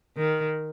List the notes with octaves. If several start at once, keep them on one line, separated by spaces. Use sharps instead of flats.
D#3